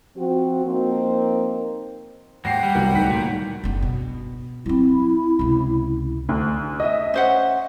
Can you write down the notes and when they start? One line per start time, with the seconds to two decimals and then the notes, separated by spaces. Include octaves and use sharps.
0.17 F3 C4 F#4
0.66 F3 A#3 C4 D#4 A#4 C5
2.45 D#2 G#2 F#5 G5 A#6 C7
2.63 G3
2.75 C2 F#3 B3
2.93 D1 D#3 B6
3.11 A#2
3.64 F#1 D4
3.82 B2
4.66 F#3 C4 E4
5.39 C#2 C3
6.29 D2
6.80 D#5 E5
7.14 C#4 C5 F#5